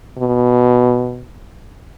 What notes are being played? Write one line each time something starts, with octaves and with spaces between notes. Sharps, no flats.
B2